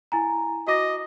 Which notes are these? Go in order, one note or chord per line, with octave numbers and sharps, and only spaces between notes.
E4 G#5 A#5
F#4 D#5 D6 A#6